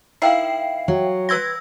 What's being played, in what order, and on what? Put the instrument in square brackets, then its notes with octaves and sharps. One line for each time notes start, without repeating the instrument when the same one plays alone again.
[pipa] D#3 E4 [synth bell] F5 G5 C7
[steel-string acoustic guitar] F#3
[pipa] B4 C6 [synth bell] E6 G#6 A#6